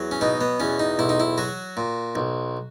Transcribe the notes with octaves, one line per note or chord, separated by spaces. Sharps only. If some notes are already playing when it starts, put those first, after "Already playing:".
Already playing: E2 F#3
C#4
B2 D#4
B3
E2 C#4
D#4
B1 E4
D#4
E4
F#3 F#4
A#2
B1